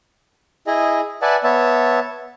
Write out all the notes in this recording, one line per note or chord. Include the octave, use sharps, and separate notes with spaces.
E4 G#4 D#5
B4 D5 E5 F#5 G#5 A5
B3 C#5 E5 A5